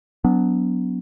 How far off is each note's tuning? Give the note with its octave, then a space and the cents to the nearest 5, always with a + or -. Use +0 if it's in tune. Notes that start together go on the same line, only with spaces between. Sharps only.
F#3 +0 B3 +0 D4 -35